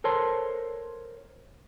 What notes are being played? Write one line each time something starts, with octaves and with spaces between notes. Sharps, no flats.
A4 A#4 C5 C#5 A5 C6